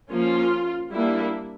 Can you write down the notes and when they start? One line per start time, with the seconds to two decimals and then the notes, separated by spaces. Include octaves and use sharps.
0.11 F3 A#3 C#4 F4
0.92 G3 A#3 D4 E4